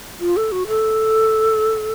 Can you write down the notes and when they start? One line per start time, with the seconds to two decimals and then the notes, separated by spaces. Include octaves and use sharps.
0.20 F4
0.37 A4
0.52 F#4
0.67 A4